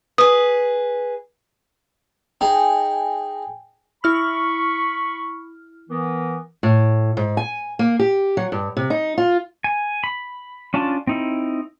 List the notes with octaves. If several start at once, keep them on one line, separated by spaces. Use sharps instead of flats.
G#4 B4 D#6
D#4 G#4 G5 G#5
E4 B5 C#6 F6
E3 B3 A#4
A2
G#2
G#5
A#3
G4
F#3
G2
C3
D#4
F4
G#5
B5
C#4 D4 F4 A5
C4 D#4 E4